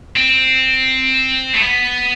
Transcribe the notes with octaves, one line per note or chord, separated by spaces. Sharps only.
C4
A3
B3